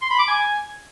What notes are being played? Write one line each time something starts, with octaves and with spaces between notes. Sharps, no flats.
C6
B5
D6
G#5